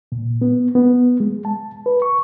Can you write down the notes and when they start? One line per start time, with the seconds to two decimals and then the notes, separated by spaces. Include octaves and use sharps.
0.12 A#2
0.41 B3
0.75 B3
1.20 G#3
1.45 A5
1.86 B4
2.02 C#6